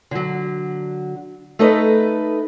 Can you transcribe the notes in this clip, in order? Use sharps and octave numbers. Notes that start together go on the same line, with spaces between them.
D3 F#3
A3 D#4 A4 B4 D#5